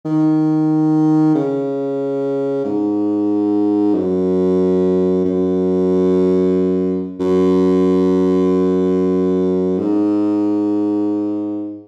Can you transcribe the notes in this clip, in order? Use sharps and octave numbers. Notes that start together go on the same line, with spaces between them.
D#3
C#3
G#2
F#2
F#2
F#2
G#2